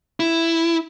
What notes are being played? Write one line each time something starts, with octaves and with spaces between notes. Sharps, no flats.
E4